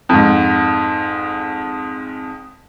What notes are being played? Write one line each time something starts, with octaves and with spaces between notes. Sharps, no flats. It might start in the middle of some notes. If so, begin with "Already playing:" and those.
F2 G#2